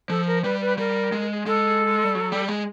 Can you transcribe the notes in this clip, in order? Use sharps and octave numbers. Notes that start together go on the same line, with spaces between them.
F3 A4
A#4
G3 B4
B4
G3 A#4
G#3
G#3 A4
G3
F#3
G3
G#3